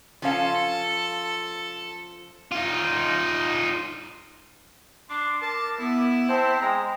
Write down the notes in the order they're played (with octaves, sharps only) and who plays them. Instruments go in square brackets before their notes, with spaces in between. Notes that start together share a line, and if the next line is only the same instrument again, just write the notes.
[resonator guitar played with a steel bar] F3 C#4 F5 [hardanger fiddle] A4
[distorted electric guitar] D#4 F4
[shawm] D4 [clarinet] C6 [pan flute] D6
[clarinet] A#4 [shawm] A5
[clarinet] B3 [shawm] E4
[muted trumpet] C4 [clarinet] C5 [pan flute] A5
[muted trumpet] G#3 [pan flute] G5 [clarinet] A#5